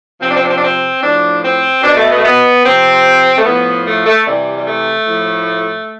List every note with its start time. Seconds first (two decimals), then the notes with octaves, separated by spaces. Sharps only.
0.21 C3 F3 C4
0.28 D4
0.35 C4
0.43 D4
0.49 C4
0.57 D4
0.64 C4
1.02 A2 F3 D4
1.43 C4
1.82 B2 D4
1.95 A3
2.09 B3
2.17 A3
2.24 B3
2.64 C3 F3 C4
3.37 A3
3.44 A2 F3 B3
3.85 A3
4.05 A3
4.24 C3 E3 G3
4.56 G3
4.66 A3
5.06 A2 F3